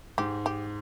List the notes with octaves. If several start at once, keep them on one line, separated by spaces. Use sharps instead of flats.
G#2 G4
G4